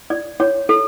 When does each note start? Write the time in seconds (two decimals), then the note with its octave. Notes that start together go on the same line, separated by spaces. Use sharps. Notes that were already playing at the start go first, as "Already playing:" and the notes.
0.10 D5
0.40 C#5
0.69 A4